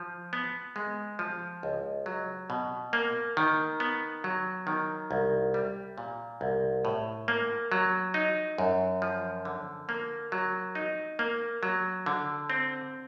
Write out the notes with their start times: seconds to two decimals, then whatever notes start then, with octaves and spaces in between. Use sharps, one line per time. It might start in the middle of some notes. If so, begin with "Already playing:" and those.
Already playing: F3
0.33 B3
0.76 G#3
1.19 F3
1.63 C#2
2.06 F#3
2.50 B2
2.93 A#3
3.37 D#3
3.80 B3
4.24 F#3
4.67 D#3
5.11 C2
5.54 G3
5.98 A#2
6.41 C2
6.85 A2
7.28 A#3
7.72 F#3
8.14 D#4
8.58 F#2
9.02 F3
9.45 D3
9.89 A#3
10.32 F#3
10.75 D#4
11.19 A#3
11.63 F#3
12.06 D3
12.50 C4